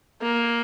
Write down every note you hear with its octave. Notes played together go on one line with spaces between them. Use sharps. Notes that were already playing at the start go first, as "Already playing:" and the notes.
A#3